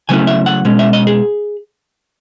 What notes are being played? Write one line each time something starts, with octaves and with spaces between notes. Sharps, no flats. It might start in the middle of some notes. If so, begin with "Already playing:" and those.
C#3 F#3 A3 C#4 E4 G#5
E5
F#5
B2 G#3 C#4
E5
D#5
G#4